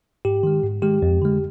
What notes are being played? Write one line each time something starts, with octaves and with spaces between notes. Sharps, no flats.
G#2 G4
D#3 G#3
G#2
D#3 G#3 G4
F2
D3 G#3